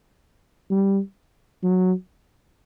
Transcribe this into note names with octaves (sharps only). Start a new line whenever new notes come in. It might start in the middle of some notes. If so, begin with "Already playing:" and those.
G3
F#3